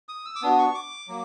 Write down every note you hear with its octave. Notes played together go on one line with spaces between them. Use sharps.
D#6
E6
D6
B3 D4 F#4 D#6
C#6
D6
F#3 A#3